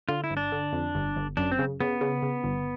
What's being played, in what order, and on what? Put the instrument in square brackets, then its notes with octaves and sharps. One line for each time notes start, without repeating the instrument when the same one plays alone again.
[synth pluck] D3 [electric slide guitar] F4
[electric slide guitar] E4
[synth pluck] G1
[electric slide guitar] D4
[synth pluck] D3
F2
G1
G1
[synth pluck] F#2 [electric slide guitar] D4
[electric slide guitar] C4
[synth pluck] C#3
[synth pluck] C#3 [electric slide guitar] B3
[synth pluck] C#3
C#3
G1